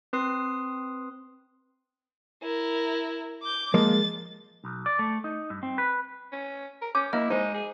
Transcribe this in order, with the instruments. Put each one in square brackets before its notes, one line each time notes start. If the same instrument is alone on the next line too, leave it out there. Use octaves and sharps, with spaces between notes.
[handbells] C4 B4 C6 D#6 C7
[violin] E4 A#4
D6 G6
[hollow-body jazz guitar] F3 G#3 A#3 [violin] A6
[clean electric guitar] B1
D5
A3
D#4
G2
C4
B4
[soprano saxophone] C#4
A#4
[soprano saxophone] C#4 [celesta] D6 [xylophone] G6
[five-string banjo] A#3 [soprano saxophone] E4 [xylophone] D#5
[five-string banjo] G#3 C5 [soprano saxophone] D#4
[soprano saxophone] G#4